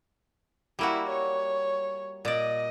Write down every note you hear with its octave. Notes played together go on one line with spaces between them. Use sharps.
G3 A#3 E4 F#4
C#5
A#2 D5 D#5